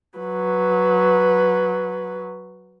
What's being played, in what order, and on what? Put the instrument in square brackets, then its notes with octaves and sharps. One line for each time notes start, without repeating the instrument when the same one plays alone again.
[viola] F#3 B4